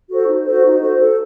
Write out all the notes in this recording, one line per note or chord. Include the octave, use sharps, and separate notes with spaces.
F#4 A4 C5
D#4
F#4 A4 C5
D#4
F#4 A4 C5
A4